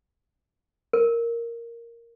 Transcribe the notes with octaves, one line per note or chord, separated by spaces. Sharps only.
A#4